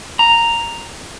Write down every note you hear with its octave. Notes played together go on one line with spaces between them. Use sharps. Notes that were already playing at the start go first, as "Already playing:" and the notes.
A#5